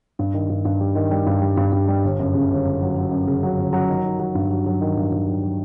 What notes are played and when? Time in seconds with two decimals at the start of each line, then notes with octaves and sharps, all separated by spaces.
0.19 G2
0.34 D#3
0.50 G2
0.65 G2
0.80 G3
0.95 D#3
1.11 G3
1.26 G2
1.41 G3
1.57 G2
1.72 G2
1.88 G3
2.04 G1
2.20 F#2
2.34 C#3
2.50 G1
2.65 F#2
2.81 F#3
2.96 F#3
3.11 F#2
3.27 C#3
3.43 F#3
3.57 G1
3.73 F#3
3.89 D#3
4.04 D#3
4.19 F#3
4.35 G2
4.51 F#3
4.66 F#3
4.81 D#3
4.97 G2
5.12 G2
5.27 F#3
5.42 F#3